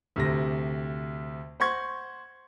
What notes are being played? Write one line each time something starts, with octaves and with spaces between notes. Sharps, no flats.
D2 C3 A#6
C5 F#5 C6 C#6 G#6